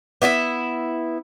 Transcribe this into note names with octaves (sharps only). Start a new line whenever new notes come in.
B3 E4 G4 E5